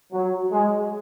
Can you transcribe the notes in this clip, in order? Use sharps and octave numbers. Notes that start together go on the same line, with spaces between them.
F#3
G#3